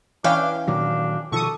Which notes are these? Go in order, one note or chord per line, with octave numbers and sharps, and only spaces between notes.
E3 C#4 D4 F5 G5
A#2 D#3 F#3 D4
B2 D#3 F3 A4 C#6 D#6